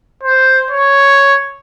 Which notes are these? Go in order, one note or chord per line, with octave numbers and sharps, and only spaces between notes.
C5
C#5